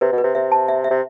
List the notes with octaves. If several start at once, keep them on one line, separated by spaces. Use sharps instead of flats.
C3 B4
B2
B4
C3
C3 E5
A5
E5
E5
C3